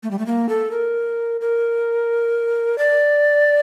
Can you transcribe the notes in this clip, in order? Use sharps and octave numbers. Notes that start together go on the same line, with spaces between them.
A3
G3
A3
A#3
A4
A#4
A#4
D5